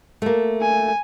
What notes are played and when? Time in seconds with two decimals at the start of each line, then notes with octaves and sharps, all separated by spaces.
0.22 A3 A#3
0.61 G#5